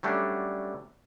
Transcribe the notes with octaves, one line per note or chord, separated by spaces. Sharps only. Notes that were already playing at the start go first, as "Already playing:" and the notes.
F#3 G3 A3 C#4 D4